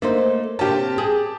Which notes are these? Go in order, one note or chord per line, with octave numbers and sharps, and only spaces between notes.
A3 A#3 D#4 C5
C3 A#3 C#4 G4 A5
G#4